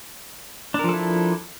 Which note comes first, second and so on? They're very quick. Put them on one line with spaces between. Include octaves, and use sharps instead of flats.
D4 A#4 F3 A4 E4